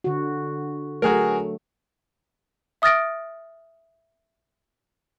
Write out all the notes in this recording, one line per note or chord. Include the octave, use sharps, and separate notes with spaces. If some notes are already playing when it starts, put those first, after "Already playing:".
D3 F#4
F#3 A3 F#4 G#4 A#4
E5 D#6 F6 A6 A#6 D7